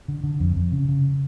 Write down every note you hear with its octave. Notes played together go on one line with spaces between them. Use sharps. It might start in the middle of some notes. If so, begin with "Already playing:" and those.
D3
D3
F2
F2
C#3
C#3